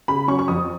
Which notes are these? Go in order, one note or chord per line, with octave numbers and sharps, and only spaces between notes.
C#3 B5
F#3 C#4 C#6
C#6
F2 D#6